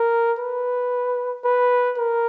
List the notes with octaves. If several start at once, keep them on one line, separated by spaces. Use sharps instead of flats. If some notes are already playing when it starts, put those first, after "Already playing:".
Already playing: A#4
B4
B4
A#4